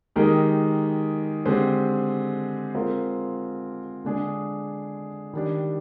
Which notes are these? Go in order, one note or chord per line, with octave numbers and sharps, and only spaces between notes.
D#3 G#3 D#4 G4 A#4
D3 G#3 C4 G4
G#3 C4 F4 A#4
D3 G#3 D4 G#4
D#3 G3 D4